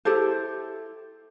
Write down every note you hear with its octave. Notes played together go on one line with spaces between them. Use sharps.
E4 G4 A4 C5